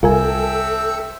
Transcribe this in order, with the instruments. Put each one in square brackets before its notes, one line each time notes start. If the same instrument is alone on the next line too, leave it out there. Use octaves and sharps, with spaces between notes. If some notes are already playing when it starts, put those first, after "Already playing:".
[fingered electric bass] C2 [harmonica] C4 E5 G5 [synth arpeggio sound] F4 A#4 G#5 [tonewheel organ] A4